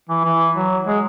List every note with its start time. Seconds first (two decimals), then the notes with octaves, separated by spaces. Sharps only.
0.09 E3
0.24 E3
0.56 F#3
0.87 G#3